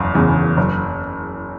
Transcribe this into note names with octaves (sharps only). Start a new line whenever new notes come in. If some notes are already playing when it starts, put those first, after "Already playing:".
Already playing: F#1 E2
E2 C#3
F#1